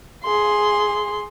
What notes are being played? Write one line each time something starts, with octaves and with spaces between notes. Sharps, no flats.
G#4 C6